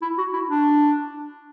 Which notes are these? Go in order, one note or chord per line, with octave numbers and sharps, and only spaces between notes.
E4
F#4
E4
D4